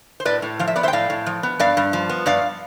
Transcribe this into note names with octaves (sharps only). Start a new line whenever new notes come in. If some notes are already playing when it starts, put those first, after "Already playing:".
C5
A2 B4 D5
A2
F3 F5
E5
B3 D5
C5 E5
G5
A2 D5 F5
A2
F3
B3
G2 D5 F5
G2
F3
B3
G2 D5 F5